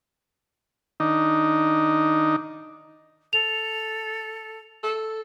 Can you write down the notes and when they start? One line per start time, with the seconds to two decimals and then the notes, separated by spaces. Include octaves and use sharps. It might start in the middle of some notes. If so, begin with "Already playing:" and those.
1.00 D#3 D4 D#4
3.33 A4 F7
4.83 A4